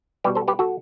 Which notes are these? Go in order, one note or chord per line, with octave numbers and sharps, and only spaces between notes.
B2 G3 G4 B4
A4 C5
G4 B4
F#4 A4